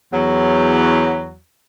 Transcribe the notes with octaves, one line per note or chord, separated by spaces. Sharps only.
E2 F#3